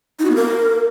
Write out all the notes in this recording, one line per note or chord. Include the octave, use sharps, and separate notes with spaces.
D#4
F#4
B3
A#4